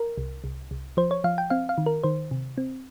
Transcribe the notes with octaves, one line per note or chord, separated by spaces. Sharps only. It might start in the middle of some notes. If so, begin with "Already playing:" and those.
Already playing: A#4
C2
C2
C2
F3 C5
C#5
F3 F5
G5
C4 F5
F5
D#3
A#4
D#3 C5
C3
C4